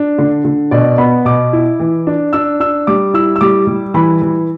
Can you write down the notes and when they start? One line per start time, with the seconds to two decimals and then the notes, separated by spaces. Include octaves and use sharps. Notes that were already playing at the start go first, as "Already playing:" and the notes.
Already playing: D4
0.18 D3
0.45 D3
0.71 B2 D5
0.98 B3 B5
1.25 B2 D6
1.53 E4
1.80 E3
2.07 D4
2.33 D4 E6
2.60 D4 E6
2.87 G3 D6
3.14 E4 E6
3.36 E6
3.41 G3 D6
3.67 G3
3.94 E3 B5
4.22 E3